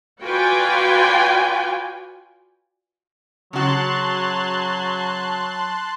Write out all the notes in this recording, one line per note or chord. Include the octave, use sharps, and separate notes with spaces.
F4 F#4 B4 D5 G5 G#5
C#3 F#3 F#4 A5 C6 F#6